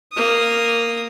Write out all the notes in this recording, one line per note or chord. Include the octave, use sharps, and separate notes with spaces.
A#3 D#6